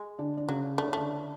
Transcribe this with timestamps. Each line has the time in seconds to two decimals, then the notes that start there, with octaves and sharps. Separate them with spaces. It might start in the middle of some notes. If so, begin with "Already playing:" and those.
Already playing: G#3
0.19 D3 D4
0.37 D4
0.48 C#3 F#3 C#4
0.78 A3 D4
0.88 C#4
0.93 D3 A3 D4